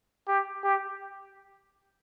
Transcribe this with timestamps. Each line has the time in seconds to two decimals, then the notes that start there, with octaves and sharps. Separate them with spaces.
0.27 G4
0.63 G4